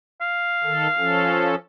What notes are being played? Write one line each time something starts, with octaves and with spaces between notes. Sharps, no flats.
F5
D#3 A4
F3 C#4 A4